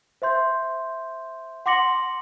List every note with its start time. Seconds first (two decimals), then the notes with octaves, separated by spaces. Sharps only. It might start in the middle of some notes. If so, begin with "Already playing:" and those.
0.22 C5 E5 C6 G6
1.66 F#5 C6 D6 A#6 C#7 F#7